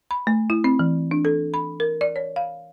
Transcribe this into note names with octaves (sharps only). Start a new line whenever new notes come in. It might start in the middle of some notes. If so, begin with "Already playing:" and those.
B5
A3
E4
C4
E3
D4
A4
B5
A#4
D5
C#5
F5